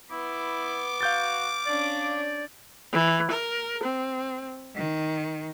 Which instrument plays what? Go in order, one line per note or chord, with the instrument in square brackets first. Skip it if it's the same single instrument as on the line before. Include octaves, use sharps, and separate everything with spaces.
[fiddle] B3 [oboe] E4 [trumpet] D6
[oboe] F#4 [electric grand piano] F5 G6 A6
[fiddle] C#4 D4 [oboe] D5
[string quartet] E3
A#4
C4
D#3